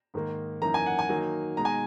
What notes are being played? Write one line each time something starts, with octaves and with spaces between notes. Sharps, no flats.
G#2 D#3 A#3
F#2 E3 A#3 D#4 A#5
G#5
F#5
G#5
D#3 F#3 A#3 D#4
B2 G#3 D#4 A#5
G#5